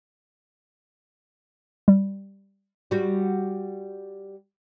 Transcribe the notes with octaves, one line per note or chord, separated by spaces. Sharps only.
G3
G3 F#4